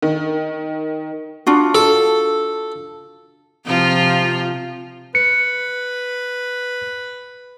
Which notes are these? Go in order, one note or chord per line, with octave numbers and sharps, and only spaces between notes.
D#3
D4 F4 F#4
A4
C3 F3 F4
B4 C#7